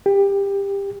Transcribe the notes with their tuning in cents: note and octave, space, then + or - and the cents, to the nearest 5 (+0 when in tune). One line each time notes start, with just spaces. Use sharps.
G4 +20